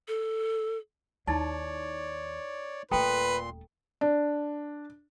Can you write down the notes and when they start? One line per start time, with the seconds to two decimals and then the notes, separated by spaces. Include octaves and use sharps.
0.08 A4
1.27 D#2 D#4 E4 C#5 D5 A5
2.91 D#1 A#2 A3 A4 B4 G5 A#5 C6
4.01 D4